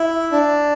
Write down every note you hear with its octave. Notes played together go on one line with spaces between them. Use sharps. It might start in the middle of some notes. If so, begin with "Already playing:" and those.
Already playing: E4
D4